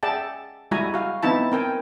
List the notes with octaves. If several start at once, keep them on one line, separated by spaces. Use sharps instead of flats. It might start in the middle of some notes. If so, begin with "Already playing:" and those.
G#4 D5 E5 F#5 G5 A5
G3 G#3 E4 F#4 G#5 A#5
F#4 F5
B3 C4 D#4 E4 A5
C4 A#4 G5 G#5